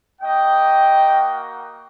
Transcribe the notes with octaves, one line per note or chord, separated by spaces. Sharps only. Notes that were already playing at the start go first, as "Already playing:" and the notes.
A#3 F#4 D#5 G5